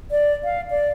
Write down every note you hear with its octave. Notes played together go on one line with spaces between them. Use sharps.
D5
F5
D5